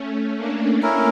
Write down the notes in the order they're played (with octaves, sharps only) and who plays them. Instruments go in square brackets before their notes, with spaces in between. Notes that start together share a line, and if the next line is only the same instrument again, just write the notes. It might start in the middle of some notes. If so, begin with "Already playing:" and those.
Already playing: [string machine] A3 C#4
A#3 D4
[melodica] C#4 E4 A#4